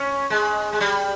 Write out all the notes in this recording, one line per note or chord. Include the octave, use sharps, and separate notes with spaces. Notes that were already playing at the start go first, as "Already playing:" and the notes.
Already playing: C#4
G#3
G#3
G3